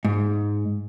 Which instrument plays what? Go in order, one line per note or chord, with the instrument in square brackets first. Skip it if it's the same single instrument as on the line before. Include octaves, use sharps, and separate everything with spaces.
[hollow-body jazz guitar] G#2